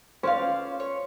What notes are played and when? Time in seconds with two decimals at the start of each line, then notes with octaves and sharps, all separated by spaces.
0.23 C#4 C5 D5 F5
0.80 C#5